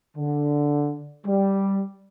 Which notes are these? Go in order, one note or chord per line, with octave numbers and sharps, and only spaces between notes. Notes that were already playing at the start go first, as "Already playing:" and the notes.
D3
G3